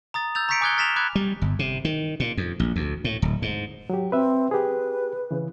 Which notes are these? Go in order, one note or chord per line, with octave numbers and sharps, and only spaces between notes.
A#5 D#6 A6
E6 G6 A6 F7
A#5 C#6 G6 B6 C#7 D7
G#5 D6 D#6 F#6 G#6 G7
F6 A6 B6 E7 F7
B5 D6 F#6 G#6
G3
G1
C3
D#3
A#2
F2
A#1
D2
A2
D1
G#2
F#3 G4
C4 B4 E5
G4 G#4 B4
C#3 E3